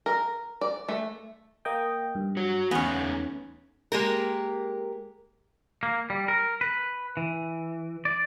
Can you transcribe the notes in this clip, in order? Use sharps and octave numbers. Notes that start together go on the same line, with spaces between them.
A#4
D5
A3
A#3 D#5 G5
G2
F#4 C#5
E2 A3 B3 C#4 D#4 G#5
G#3 A#3 G4 A#4
A#3
G3
A#4
B4
E3
D5